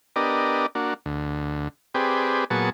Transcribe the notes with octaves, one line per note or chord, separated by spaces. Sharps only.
B3 D4 G4 A#4 D5 D#5
A#3 D4 F#4
D2
C4 G4 G#4 B4 D5
A#2 F#3 B3 G#4 A5 C#6